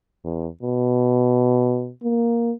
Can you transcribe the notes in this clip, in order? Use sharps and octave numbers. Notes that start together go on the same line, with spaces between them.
E2
B2
A#3